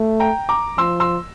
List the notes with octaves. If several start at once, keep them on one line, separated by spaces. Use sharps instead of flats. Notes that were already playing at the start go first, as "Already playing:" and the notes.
Already playing: A3
G5 A#5
A#5 D6
F3 C6 E6
C6 E6